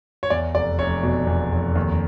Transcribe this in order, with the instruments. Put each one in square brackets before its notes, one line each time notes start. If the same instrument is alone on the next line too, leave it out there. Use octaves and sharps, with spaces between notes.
[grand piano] C#5
E2 D5
F1 D5
F1 C#5
B2
E2
F1
D#2